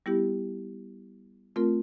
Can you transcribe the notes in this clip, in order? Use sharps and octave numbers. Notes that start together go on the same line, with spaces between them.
G3 B3 E4 G4
A3 C4 F4 A#4